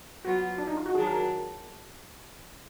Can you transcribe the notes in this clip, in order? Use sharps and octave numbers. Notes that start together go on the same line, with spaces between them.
F#3 B3 F4 F#4
D4
D#4
F4
F#4
D#3 F#3 D4 G#4
A#4